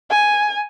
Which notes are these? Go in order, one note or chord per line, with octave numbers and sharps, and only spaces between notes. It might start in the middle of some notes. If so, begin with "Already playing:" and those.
G#5